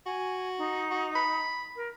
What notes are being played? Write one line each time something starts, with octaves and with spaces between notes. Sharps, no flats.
F#4 G#5
D#4
F#4
B5
A#4